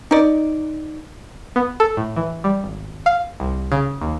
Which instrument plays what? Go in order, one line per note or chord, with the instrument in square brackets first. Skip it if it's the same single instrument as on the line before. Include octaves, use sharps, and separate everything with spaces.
[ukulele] D#4 D5
[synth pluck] B3
A4
A2
E3
G3
G#1
F5
C2
C#3
D#2